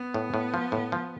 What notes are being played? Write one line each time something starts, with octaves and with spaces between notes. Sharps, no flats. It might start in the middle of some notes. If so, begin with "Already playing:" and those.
Already playing: B3
A2
A2
F3
A2
F3